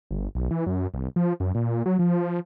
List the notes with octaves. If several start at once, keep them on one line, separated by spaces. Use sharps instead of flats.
G1
B1
E3
F#2
C2
F3
F#2
A#2
F#3
F3